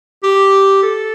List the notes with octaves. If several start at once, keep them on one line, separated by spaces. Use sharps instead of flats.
G4
A4